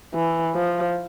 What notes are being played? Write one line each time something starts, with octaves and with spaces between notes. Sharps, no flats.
E3
F3